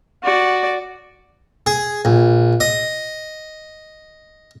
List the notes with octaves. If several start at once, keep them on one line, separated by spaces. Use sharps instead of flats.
F#4 D5
G#4
A#1
D#5